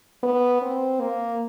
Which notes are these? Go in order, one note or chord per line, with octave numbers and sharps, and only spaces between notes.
B3
C4
A#3